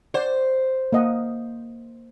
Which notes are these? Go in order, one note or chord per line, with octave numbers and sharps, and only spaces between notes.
C5 D5 F#5
A#3 D#5 F#5